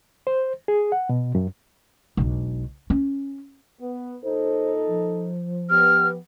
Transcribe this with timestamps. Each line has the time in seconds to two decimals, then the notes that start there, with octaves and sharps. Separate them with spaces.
0.27 C5
0.68 G#4
0.92 F#5
1.09 B2
1.35 F#2
2.17 E1 B1
2.90 C#4
3.80 B3
4.23 A#2 D#4 A4 C5
4.88 F3
5.70 B3 G4 F6